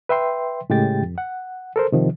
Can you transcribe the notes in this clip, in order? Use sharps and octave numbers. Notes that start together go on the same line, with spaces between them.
B4 E5 G5 C6
A2 C#3 G#3 G4 G5 A6
F2
F#5
A4 A#4 C5
C3 D#3 F3